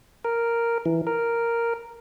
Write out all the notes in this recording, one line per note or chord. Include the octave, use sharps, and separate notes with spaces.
A#4
E3
A#4